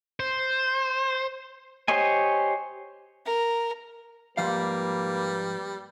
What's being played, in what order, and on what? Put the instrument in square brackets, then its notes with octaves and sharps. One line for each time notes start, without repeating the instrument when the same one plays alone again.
[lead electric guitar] C5
[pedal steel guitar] G4 C5 C#5 D#5 G#5
[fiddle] A#4
[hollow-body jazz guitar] G#2 F3 F5 [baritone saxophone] G3 [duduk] A#3 [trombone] B4